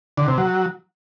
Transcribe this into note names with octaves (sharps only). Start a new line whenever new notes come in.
D3
C3
F#3